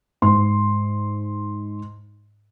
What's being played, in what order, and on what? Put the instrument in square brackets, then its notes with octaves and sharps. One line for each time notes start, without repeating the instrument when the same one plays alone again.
[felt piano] G#2 C6